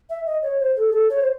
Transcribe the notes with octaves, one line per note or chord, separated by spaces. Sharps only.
E5
D#5
C#5
C5
A4
G#4
A4
C#5
C5